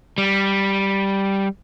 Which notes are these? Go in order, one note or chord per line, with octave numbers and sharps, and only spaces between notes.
G3